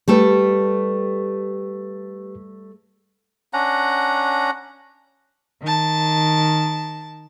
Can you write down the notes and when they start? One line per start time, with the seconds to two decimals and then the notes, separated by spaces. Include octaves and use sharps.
0.08 G3 A3 G4 A4 B4
3.53 C#4 D4 F#5 A#5
5.63 D#3 A5